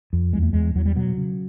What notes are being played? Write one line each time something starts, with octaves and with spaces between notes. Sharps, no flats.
F2
E2 G#3
A3
E2 G#3
E2 F#3
G3
B2 F#3
C#3